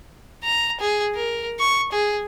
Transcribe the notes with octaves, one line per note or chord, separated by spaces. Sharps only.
A#5
G#4
A#4
C#6
G#4